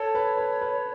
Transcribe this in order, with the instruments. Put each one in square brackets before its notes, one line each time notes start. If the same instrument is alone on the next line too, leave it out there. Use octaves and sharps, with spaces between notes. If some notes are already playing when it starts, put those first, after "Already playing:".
Already playing: [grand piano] A4 [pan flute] C#5
[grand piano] B4
B4
B4